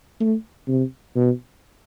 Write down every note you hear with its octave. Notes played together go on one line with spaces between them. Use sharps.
A3
C3
B2